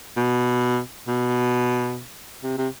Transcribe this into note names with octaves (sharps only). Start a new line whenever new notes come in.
B2
B2
C3
C3